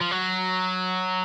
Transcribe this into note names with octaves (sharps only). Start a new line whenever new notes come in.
F3
F#3